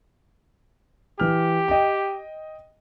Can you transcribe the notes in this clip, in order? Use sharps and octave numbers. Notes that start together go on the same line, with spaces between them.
E3 G4 F6
D#5 G5